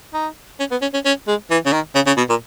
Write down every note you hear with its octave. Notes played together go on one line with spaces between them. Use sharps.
D#4
C#4
B3
C#4
C#4
C#4
G#3
E3
C#3
D#3
C#3
C#3
B2
A#2